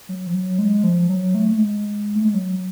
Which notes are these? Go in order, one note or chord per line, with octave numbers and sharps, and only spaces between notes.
F#3
F3
F#3
G#3
F3
F#3
A3
A3
G#3
A3
G#3
F#3